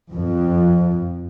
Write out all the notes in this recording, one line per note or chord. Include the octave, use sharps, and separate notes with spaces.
F2